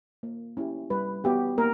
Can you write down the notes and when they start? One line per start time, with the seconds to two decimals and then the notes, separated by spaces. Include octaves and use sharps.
0.23 A#3
0.57 C#4 E4 G4
0.90 G3 B4
1.24 B3 F#4 G4
1.58 A#3 A#4